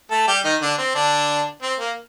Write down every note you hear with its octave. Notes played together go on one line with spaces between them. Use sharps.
A3 A4
G3 G4
D#3 D#4
D3 D4
C4
D3 D4
C4
A#3